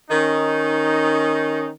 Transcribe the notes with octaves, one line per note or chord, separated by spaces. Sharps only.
D#3 C#4 D#4